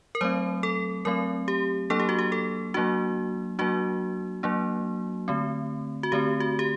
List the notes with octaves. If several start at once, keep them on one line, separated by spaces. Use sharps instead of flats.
A#4
F#3 A3 C4 C5
A4
F#3 A3 C4 A#4
G4
F#3 A#3 D4 A4
G4
F#4
G4
A4
F#3 A#3 D4 F#4
F#3 A#3 D4 F#4
F#3 A#3 D4
D3 A3 C4
F#4
D3 A3 C4 G4
F#4
G4